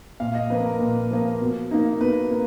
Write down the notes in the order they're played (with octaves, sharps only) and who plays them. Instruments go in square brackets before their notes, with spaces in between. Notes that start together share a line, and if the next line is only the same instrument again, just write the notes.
[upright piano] A#2 [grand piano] F5
[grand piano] D#5
[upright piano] F3 A#3 [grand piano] B4
[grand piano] A#4
[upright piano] A#2
F3 A#3
B2
A#3 D#4
[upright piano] B2 [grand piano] B4
[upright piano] A#3